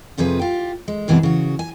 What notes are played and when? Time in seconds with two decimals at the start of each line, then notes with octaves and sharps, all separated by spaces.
0.17 F2 C3 F3 G#4 B4
0.39 F4 G4
0.88 G#3
1.08 F#2 C3 E3 G#3 B3 G#4
1.23 C#3 F#4
1.59 G#5